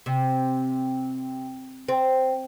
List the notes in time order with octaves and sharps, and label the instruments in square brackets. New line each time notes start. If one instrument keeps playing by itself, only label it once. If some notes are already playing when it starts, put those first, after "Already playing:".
[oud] C3
C4